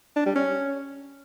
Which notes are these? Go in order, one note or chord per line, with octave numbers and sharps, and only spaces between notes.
D4
G3
C#4